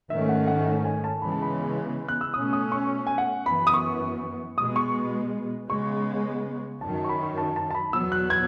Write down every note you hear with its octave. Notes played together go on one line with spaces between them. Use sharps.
G#2 D#3 A3 C#4 E5
F#5
F#5
F#5
G#5
A5
C#3 E3 G#3 B3 B5
A5
B5
F#6
E6
B2 A3 C#4 D#6
D#6
C#6
G#5
F#5
F#2 E3 B3 B5
D#6
C#6
B2 G#3 B3 D#6
C#6
C#3 G#3 B3 C#6
F#2 D#3 F#3 A5
A5
C#6
B5
C#6
A5
A5
A5
B5
E2 B2 F#3 B3 E6
F#6
G#6